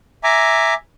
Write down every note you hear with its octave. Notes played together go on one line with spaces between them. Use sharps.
E5 G#5 A#5 D6